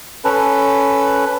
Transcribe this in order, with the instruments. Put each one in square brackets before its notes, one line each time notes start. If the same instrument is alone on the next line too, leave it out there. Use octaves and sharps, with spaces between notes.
[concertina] C#4 A4 B4